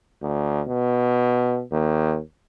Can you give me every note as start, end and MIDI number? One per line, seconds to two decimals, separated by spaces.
0.22 0.62 38
0.68 1.62 47
1.72 2.19 39